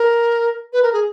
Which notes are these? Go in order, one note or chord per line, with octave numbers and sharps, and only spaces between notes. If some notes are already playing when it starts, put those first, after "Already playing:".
Already playing: A#4
B4
A#4
G#4